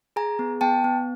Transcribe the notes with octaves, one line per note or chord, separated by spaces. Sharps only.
G#4 G#5 A#5
B3
B3 G5 A5
B3